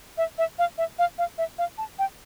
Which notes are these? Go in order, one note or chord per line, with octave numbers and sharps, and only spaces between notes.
E5
E5
F5
E5
F5
F5
E5
F5
A5
G5